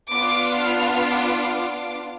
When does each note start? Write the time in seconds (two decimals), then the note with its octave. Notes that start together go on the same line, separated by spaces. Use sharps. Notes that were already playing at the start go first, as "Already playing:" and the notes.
0.11 B3 D4 F4 D6
0.60 F6
1.06 D6
1.54 D6